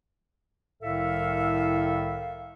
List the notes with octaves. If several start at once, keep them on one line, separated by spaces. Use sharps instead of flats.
C2 A2 D#3 A4 E5 F5